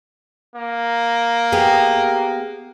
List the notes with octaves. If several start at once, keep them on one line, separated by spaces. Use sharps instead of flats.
A#3
B3 G4 G#4